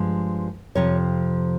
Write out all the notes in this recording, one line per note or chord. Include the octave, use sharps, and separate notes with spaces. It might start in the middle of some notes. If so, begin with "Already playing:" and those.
Already playing: G2 F3 G#3
F2 C3 F3 C#5